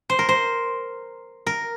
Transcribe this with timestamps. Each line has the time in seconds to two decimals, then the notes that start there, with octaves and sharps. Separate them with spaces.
0.10 C5
0.19 A#4
0.29 C5
1.47 A#4